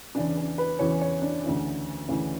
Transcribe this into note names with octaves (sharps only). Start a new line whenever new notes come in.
E2 C#3 E3 D4
C#4
B4
E2 C#3 E3 C#5
C#5
D4
D2 C#3 E3
D2 C#3 E3